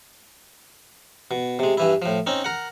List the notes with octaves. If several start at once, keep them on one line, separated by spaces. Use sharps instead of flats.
B2
C3 G#3
G2 E3 E4
A2 F3
C4 C#4 D#4
A#4 F#5